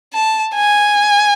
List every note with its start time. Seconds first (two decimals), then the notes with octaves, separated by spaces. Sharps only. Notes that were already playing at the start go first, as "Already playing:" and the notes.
0.14 A5
0.54 G#5